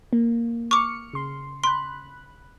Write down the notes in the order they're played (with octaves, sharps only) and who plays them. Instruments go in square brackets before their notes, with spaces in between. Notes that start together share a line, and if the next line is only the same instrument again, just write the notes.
[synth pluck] A#3
[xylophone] C#6 D6 [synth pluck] F6 C#7
[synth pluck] C#3 C6
[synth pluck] B5 F#6 [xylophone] C6